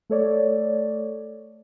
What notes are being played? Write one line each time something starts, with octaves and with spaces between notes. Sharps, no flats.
A3 A4 C#5 D5